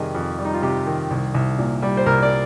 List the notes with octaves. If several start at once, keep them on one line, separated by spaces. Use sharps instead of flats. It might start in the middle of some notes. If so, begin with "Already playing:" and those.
Already playing: F2 C3 D#3 G3 G#4 D#5
F2
G3
D#4
F4
C3 G4
D#3
C2
C2
A#2
G3
C5
C2 A#4
D5